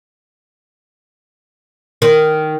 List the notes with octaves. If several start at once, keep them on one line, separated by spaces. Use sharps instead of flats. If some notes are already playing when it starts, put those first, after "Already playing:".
D#3